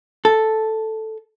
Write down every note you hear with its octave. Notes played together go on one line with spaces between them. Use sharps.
A4